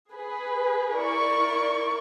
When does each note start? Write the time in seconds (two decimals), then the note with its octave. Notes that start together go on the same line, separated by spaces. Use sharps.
0.10 G#4 B4
0.98 E4 A#4 D5 C#6